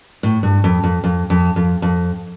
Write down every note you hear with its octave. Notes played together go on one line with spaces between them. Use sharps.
A2
G2
F2
F2
F2
F2
F2
F2